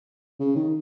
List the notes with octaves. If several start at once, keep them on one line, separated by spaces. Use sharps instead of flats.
C#3
D#3